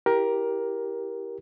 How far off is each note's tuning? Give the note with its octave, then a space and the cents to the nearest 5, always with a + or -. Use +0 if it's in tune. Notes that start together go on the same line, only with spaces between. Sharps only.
E4 +0 G4 +0 A#4 +15